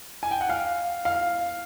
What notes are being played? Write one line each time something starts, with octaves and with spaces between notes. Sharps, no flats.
G#5
G5
F#5
F5
F5